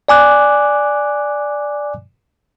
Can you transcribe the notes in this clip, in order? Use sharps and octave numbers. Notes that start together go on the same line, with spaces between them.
D5 G#5 D6 F#6